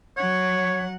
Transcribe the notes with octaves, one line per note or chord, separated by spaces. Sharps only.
F#3 C#5 F#5